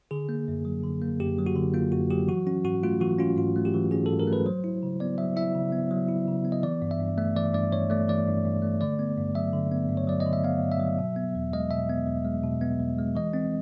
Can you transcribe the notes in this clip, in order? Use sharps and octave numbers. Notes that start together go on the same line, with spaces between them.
D3 G#4
A#3
F#2
F#3
D3
A#3
F#2 G4
F#3
F#4
D3
A#3 F4
F#2 F#4
F#3 G4
E3 F#4
C#4 F#4
G#2 F#4
A3 F4
E3 F#4
C#4 F4
G#2 F4
A3
G4
E3
C#4 G#4
G#2 A4
A#4
A3
B4
F#3 C5
E4
C#3
B3 D5
F#3 E5
E4 E5
C#3
B3
F#3
E4
C#3
B3
D#5
E3 D5
G2
E5
G2
A3 E5
E3 D5
G2 D5
G2 C#5
A3 D5
E3 D5
G2
G2
A3
D3 D5
B3
G2
F#3 E5
D3
B3
G2
C#5
F#3 D5
D#5
D3
E5
B3 F5
G2
E5
F#3
B2
B3
E2
G#3 D#5
B2 E5
B3
E2
G#3
B2
B3
E2
G#3
E3 D#5
C4